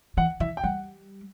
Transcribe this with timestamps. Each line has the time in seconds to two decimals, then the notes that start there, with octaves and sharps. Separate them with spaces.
0.17 E3 F#5
0.40 E3 E5
0.57 G5
0.64 G3 F#5